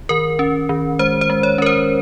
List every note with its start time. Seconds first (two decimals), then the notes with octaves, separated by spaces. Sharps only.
0.09 D#3 A#4
0.39 C#4
0.69 D#3
0.99 G#3 C5
1.21 C5
1.30 G#3
1.43 C#5
1.58 C#4 A#4
1.66 C5